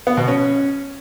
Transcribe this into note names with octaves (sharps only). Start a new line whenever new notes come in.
B3
B2
C#4